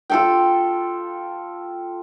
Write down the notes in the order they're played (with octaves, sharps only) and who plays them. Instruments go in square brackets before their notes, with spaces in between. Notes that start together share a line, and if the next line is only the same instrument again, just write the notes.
[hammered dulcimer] F4 A4 G5